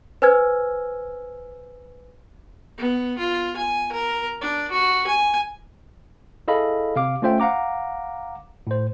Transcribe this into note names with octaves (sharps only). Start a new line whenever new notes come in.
B4 C5 G#5 E6 F6 G#6
B3
F4
G#5
A#4
D4
F#4
G#5
E4 G#4 A4 D#5 F5 B5
C3 F5 D6
A3 C#4 F4 C5 E5 G5
F5 F#5 A#5 D6
A2 C5